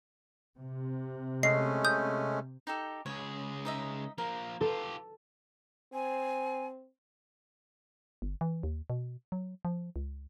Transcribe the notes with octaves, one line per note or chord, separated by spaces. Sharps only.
C3
G#3 A3 C#4 D#5 C7
D#6 G6
D#4 G4 A4
C#2 G#4 C#5
D#4 D#5 E5
F3 A#3 A#4
F4 G4 A4
C4 G#5
G1
E3
D#2
B2
F#3
F3
C#2